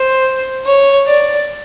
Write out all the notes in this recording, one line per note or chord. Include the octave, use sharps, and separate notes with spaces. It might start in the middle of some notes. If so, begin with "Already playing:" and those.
Already playing: C5
C#5
D5